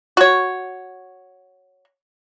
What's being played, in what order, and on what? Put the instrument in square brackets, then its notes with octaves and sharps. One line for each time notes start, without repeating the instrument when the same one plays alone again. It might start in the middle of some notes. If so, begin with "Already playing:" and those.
[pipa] F#4 C#5